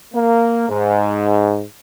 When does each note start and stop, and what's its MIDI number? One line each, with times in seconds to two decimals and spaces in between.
0.14 0.68 58
0.70 1.64 44